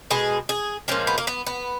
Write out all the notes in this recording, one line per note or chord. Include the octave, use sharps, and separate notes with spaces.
B2 G#3 G#4
G#4
A#2 F3 G#3 C#4
B3
A#3
B3
B3